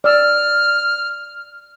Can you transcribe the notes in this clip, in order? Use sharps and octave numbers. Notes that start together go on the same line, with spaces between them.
D5 E6 F6